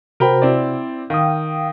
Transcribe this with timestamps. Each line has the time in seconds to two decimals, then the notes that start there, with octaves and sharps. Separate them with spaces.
0.20 C3 F#4 A#4 C5 G5 B5
0.42 C4 E4 D5
1.10 D#3 F5 G5 D#6